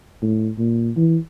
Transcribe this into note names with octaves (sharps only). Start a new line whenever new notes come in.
A2
A#2
E3